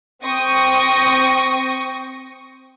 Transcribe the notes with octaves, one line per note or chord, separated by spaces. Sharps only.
C4 G5 C#6 D#6 A#6